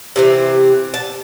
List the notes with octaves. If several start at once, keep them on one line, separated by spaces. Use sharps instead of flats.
C3 E3 C4
A5